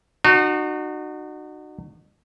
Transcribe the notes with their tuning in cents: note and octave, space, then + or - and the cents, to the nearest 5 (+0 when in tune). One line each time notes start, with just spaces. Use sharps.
D#4 -40 F#4 -5